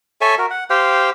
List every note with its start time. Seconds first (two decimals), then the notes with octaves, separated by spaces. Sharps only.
0.21 A4 C#5 E5 G#5
0.38 F#4 A#4
0.50 F#5
0.70 G4 C5 F5 G5